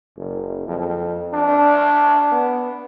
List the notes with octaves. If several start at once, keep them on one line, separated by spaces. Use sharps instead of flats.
F#1
F2
D4
B3